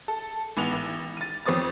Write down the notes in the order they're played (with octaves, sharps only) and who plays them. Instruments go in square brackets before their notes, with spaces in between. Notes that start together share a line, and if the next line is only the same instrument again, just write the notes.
[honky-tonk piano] A4
A1 G#3 B3 F7
A1
A6 D#7
F2 C4 C#5 D#6 A6